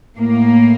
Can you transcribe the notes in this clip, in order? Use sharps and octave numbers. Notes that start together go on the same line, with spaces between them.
A2 A#3